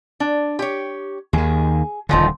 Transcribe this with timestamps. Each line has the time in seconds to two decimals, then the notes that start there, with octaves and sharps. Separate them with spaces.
0.20 D4
0.59 G4 C#5
1.33 D#2 D#3 G#4
2.09 D#1 A#2 D3 F3 D#4